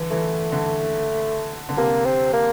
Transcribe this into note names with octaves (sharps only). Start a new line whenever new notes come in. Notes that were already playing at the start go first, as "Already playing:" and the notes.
Already playing: D3 E3
E3 A3
D3
D3
C3 A#3
C4
A#3